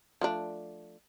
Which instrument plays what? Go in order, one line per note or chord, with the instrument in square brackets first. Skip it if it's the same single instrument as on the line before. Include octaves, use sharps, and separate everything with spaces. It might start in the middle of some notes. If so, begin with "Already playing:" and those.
[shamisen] F3 A3 D4